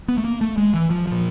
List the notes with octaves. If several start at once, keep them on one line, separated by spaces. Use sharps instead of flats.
B3
A3
A#3
A3
G#3
E3
F3
A#2 F3